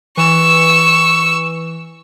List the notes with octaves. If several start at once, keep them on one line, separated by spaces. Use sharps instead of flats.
E3 C#6 E6